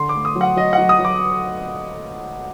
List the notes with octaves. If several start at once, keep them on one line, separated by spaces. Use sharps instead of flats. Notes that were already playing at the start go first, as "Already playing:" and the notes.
Already playing: D3 C6
D6
A3
D#6
F#3
F#5
F#3 D#5
F#5
F#3
D#6
F#3
D6